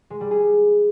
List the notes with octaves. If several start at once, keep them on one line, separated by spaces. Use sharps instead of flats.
G#3
G3
G#4